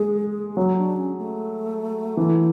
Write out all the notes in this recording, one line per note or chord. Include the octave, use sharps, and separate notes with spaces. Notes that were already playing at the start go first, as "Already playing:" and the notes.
Already playing: G#3 G#4
F#3 F#4
D4
C#4
A3
E3